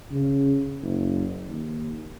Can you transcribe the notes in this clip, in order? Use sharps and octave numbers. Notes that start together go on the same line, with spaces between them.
C#3
F#1
D#2